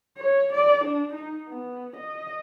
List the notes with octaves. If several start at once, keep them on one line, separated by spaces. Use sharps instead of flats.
C#5
D5
D4
D#4
B3
D#5